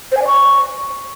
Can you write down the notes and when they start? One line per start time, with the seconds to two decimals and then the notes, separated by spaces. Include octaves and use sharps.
0.12 C5
0.17 G#5
0.22 D5
0.27 C#6